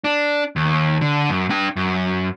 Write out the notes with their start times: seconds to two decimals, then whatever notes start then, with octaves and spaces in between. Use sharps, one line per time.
0.04 D4
0.56 D#2
1.01 D3
1.29 F#2
1.50 D4 G5
1.76 F#2